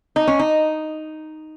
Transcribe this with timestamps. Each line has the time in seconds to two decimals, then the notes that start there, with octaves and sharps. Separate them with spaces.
0.16 D#4
0.27 C#4
0.39 D#4